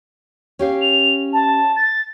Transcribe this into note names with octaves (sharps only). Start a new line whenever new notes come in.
C#4 G4 F5
F7
A5
A6